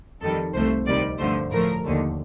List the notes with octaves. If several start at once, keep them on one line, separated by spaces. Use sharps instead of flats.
F2 D#3 G3 A4
C2 C3 F3 A3 C5
D2 C3 D#3 G3 D5
G2 D3 F3 A3 C5
A2 F3 A3 A#4
D#2 D3 A3